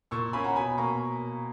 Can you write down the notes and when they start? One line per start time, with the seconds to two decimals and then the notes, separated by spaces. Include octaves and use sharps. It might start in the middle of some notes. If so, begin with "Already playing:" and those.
0.11 A#2 C#6 E6
0.33 A#3 C#4 G#5 B5
0.44 F#5 A#5
0.55 B2 G#5 B5
0.77 A#3 A#5 C#6